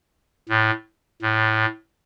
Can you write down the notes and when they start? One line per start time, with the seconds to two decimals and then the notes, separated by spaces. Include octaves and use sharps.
0.49 A2
1.22 A2